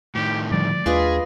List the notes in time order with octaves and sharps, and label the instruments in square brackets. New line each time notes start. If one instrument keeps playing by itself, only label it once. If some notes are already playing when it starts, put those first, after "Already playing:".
[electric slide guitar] A2 D#3 [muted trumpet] G4
[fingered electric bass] D3 F3 G3 [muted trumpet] D5
[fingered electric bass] D#2 A3 D4 [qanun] F4 B4 D#5 [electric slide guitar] G#4